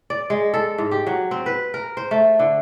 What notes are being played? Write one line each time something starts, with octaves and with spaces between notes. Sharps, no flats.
D5
G#3
A4
G#2
G4
F#3
C4
B4
A#4
C5
A3
D3